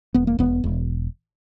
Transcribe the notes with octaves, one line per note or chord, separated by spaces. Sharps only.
E1 B3
A#3
E1 B3
E1